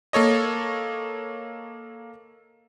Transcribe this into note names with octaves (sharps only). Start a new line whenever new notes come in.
A#3 A4 C#5 D#5